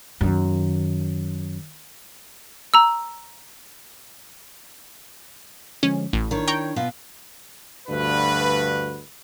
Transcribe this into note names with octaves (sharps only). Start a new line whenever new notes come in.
F#2 D#3
A#5 E6
D3 F3 G#3 C#4
A1 A3
D#3 D4 E4 C#5
G5 A#5 C#6
B2 B3 F4
D2 G2 F#4 B4